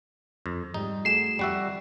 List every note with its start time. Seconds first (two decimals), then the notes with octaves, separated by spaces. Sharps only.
0.46 F2
0.74 G#2 G3 D#4
1.05 A3 F#4 G#4 C7 E7
1.39 F2 G3 F#4 D5 E5